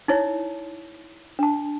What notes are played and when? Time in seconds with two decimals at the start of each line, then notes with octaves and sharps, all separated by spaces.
0.08 D#4 E4 C#5
1.39 D4 A5